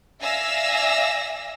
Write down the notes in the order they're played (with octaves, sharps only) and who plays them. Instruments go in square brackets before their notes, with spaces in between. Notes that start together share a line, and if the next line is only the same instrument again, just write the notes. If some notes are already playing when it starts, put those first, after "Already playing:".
[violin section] D5 E5 F5 G#5 E6 A#6